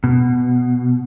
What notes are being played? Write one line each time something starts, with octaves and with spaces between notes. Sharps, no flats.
B2